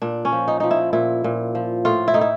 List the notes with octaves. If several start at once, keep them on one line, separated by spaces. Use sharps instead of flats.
A#2 D4
C#4
F3
D#4
F3 D#4
E4
A#2 E4
A#2
F3
A2 F4
E4
A2 D#4
E4